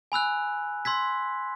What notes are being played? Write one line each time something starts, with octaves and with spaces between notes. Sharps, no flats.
G#5 B5 E6 F#6
C6 E6 G#6 B6